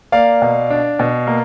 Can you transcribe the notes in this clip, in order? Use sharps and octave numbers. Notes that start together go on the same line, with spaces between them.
A#3 D5 F5
B2
D4
B2
A#3